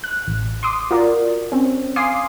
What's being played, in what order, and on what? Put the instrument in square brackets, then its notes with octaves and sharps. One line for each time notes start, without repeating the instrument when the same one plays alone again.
[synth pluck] F#6
A1
C6 D6 D#6
F4 F#4 A#4 D5
C4 C#4
F5 G#5 C6 D6 D#6 C7